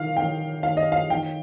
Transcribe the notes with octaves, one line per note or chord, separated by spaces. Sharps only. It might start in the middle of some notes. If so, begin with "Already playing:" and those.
Already playing: D#3 F5
D#3 G5
D#3 F5
D#5
F5
D#3 G5